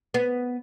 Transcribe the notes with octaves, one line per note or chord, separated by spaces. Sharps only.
B3